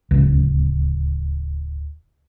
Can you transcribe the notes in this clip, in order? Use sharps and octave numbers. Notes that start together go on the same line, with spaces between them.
D1 C#2